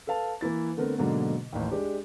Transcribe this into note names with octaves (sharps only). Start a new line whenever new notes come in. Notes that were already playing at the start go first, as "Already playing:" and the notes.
A4 B4 F5 A5
E3 A#3 E4 A6
D3 A3 B3 C4 A#4
G#2 B2 D3 F#3 A#3
A1 D#2
G#3 D4 G4